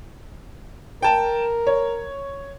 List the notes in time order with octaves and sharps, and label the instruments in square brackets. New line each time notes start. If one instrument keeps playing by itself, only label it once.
[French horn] A#4 [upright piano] G5 A5
[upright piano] C#5